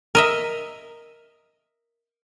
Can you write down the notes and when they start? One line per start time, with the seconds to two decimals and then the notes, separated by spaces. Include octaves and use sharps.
0.15 A#4 D#5 E5